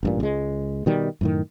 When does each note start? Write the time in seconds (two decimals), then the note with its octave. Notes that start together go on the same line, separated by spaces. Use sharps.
0.03 A1 G2 A#2
0.20 C#2 G#3
0.86 B2 D#3 G3
1.21 F#2 A2 D#3